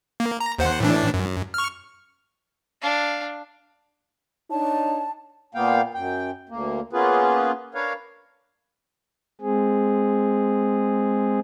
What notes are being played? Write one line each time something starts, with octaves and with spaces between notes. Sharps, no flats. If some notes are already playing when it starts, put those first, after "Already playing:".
A#3
A#5
D#2 C5 F#5
A2 E3 D4
F#2
C#6 F6
D4 F5
D4 D#4 C#5 A5
A#2 A#3 B3 F5 G5
F#2 G5
D2 A#3
A#3 B3 C#4 F4 G#4 B4
D4 A#4 B4 C#5 F5
G#3 C4 G#4